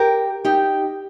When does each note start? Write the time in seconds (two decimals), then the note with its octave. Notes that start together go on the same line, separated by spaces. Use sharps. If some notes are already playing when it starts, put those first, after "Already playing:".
Already playing: G4 A#4
0.45 D#4 G4